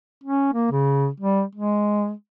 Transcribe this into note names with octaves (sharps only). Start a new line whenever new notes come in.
C#4
A#3
C#3
G3
G#3